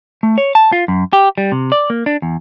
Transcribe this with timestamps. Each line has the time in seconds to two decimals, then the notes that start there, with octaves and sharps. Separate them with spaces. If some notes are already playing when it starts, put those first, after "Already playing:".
0.23 A3
0.38 C#5
0.55 A5
0.72 F4
0.88 F#2
1.13 G4
1.38 G3
1.52 C3
1.72 D5
1.90 A#3
2.06 D4
2.22 E2